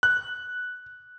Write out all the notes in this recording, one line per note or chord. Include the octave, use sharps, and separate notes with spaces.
F#6